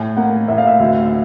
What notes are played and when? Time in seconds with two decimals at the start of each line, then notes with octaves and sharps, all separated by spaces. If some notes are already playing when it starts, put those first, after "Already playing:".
Already playing: A2 G#5
0.17 A#3 F#5
0.48 A2 E5
0.58 F5
0.67 E5
0.79 D2 E5